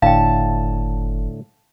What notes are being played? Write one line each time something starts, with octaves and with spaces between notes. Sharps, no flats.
F#1 A2 D3 A3 F5 G5 A5